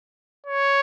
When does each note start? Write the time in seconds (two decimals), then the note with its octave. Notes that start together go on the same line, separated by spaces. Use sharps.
0.46 C#5